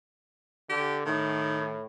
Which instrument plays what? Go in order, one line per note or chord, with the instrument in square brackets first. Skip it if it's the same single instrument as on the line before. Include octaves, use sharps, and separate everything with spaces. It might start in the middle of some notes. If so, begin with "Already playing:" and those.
[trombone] D3 [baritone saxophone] G4
[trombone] A2 [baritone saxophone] D#3